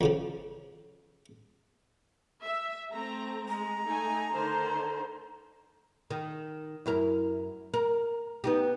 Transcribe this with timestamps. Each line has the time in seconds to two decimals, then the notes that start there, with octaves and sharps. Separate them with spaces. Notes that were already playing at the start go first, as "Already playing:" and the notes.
0.01 F2 C#3 F3
2.43 E5
2.91 A3 C4 A#5
3.48 G#3 A#5
3.88 A3 D#4 G#5
4.31 D3 D#3 C5
6.10 D#3
6.86 F#2 E4 A#4
7.74 A#4
8.44 B3 D#4 G4